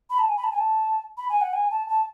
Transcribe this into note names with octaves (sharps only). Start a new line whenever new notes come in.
B5
A5
G#5
B5
A5
G#5
A5
B5
G#5
F#5
G#5
A5
A5